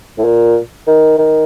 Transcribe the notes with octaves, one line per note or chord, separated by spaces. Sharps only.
A2
A#2
D#3
D#3